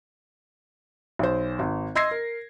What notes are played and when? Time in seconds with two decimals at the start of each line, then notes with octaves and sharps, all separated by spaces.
1.19 B1 C5
1.59 G#1
1.95 D#5 C6 E6 G#6 A#6 C7
2.11 A#4